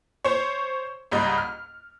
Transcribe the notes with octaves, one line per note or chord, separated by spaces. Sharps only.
C5 C#5
C#2 G#2 G3 D#5
F6